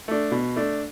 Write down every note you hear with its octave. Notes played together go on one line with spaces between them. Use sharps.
A3 D4
B2
A3 D4